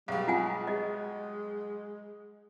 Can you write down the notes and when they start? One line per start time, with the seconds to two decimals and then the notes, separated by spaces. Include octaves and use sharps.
0.08 B1 G3 G#3 F5
0.28 F4 F#5 G#5
0.67 G#3 D#5